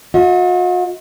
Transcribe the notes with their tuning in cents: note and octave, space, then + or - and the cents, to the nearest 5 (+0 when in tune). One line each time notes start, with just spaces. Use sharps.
F#4 -45 D#5 +45